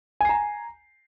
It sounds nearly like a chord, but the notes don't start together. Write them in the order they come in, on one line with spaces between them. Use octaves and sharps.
G#5 C7 A#5